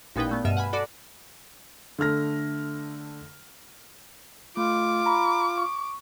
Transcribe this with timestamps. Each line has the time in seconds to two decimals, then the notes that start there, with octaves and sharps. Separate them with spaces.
0.16 A1 A#2 B3 D#4 B4 G5
0.29 A#2 A3 B3
0.45 G2 B2 E5 F6 D#7 E7
0.57 F#5 G#5 B5
0.73 F#4 A4 D5 B5 D6
1.99 D3 A3 F6 A#6
4.57 A3 F4 D6
5.06 A#5 B5
5.58 C#6